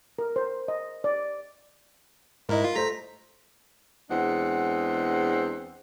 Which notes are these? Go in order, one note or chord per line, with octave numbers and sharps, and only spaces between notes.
A#4
C5
D#5
D5
G#2 E4 A#4 D#5
F4
A3 C5 A#5 B6
E2 G#3 C4 D4 F#5